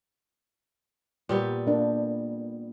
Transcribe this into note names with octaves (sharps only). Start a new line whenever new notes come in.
A#2 G3 B3
A#3 D4